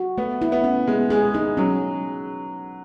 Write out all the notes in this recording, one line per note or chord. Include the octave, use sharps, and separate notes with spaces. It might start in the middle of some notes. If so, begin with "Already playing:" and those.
Already playing: F#4
A3 B3
E4
B3
C#4
G#3 B3
G#3 G#4
G#3 D#4
F#3 C#4